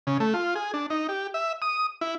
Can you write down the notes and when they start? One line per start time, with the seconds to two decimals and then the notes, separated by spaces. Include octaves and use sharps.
0.07 C#3
0.20 A3
0.34 F4
0.55 G#4
0.74 D4
0.90 D#4
1.09 G4
1.34 E5
1.62 D#6
2.01 E4